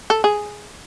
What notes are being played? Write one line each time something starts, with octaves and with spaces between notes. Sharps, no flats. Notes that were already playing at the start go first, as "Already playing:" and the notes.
A4
G#4